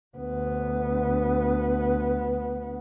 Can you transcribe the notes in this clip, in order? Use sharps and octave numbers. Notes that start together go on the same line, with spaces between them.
D2 B3